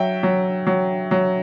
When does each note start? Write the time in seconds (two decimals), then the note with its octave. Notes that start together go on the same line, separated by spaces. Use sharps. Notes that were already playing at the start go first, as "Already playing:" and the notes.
Already playing: F#3 E5 G5
0.23 F#3
0.67 F#3
1.11 F#3